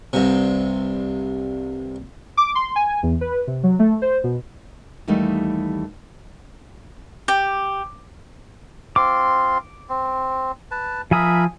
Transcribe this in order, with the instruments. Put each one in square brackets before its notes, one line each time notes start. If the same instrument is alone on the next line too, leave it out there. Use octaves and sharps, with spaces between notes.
[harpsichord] C2 G2 C3
[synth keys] D6
C6
G#5
E2
B4
C3
F#3
A3
C5
B2
[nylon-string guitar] D#2 E3 G3 A3 D#4
[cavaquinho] G4
[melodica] C4 F4 C6 [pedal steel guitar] D6
[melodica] C4
B4 A5
[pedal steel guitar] F3 G#5 D#6 [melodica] A#4 E5 B5